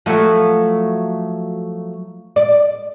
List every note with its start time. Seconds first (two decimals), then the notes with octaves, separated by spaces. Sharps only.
0.06 F3 F#3 A3
2.36 D5